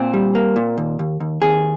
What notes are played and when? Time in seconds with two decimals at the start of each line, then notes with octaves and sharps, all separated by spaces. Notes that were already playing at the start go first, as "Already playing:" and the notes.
Already playing: A#2 C4
0.14 G3
0.35 A#3
0.56 A#2
0.78 D#2
0.99 D#2
1.20 D#2
1.42 D#2 G#4